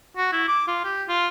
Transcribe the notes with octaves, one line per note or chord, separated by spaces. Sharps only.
F#4
E4
D6
F4
G4
F4